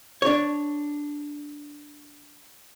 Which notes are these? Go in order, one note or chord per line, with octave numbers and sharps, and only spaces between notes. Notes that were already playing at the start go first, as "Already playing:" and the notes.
D4 C#5